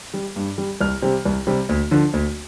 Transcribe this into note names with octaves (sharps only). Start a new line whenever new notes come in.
G3
G2
G3
C2 F6
C3 G3
C2
C3 G3
D2
D3 F3
D2